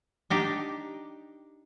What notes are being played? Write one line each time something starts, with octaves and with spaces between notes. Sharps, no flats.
D4 D#4 G4